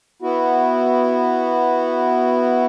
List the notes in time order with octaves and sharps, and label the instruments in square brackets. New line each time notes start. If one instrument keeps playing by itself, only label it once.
[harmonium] B3 E4 F#4